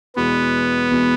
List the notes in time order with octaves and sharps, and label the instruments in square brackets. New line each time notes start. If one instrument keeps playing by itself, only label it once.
[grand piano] E2 B2 G#3 [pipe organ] B3
[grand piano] E2 B2 G#3